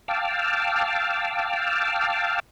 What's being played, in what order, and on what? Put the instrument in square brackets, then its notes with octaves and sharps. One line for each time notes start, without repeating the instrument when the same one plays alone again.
[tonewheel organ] F5 G5 A5 D6 E6 F6